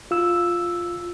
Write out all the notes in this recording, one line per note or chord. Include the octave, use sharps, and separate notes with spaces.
F4 E6